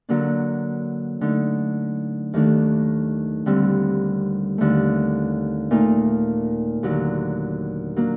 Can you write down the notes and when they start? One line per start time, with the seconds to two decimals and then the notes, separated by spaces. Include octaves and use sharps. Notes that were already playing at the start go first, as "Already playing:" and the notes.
0.09 D3 F#3 A#3 D4
1.21 D3 A3 D#4
2.33 D#2 D#3 A3 D4
3.46 D#2 D3 G3 C4
4.58 D#2 D3 A3
5.71 A#2 A3 D#4
6.83 D#2 D3 F#3
7.96 F#3 A#3 D4